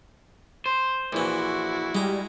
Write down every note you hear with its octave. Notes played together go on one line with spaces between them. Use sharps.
C5
A#1 E3 E4 F#4
G3 G#3 A#5